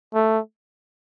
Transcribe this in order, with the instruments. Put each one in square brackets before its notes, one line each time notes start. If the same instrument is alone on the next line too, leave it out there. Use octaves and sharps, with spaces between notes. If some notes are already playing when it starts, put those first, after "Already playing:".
[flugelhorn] A3